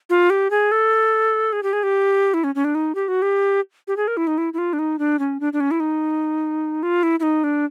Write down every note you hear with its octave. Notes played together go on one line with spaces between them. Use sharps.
F4
G4
G#4
A4
G#4
G4
G#4
G4
E4
C#4
C#4
D4
D#4
G4
F#4
G4
G4
G#4
A#4
E4
D#4
E4
E4
F4
D4
D#4
D4
C#4
D4
D4
C#4
E4
D#4
F4
E4
E4
D#4
D4